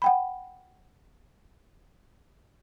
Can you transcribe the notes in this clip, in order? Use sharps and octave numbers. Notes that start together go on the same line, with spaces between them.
F#5 G5 B5